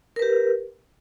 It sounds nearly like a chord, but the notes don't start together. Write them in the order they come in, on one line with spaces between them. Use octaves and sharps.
A#4 B4 G4